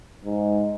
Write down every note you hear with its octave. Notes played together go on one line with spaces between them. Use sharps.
G#2